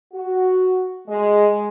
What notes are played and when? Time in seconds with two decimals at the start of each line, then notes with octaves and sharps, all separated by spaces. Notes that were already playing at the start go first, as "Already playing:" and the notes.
0.13 F#4
1.08 G#3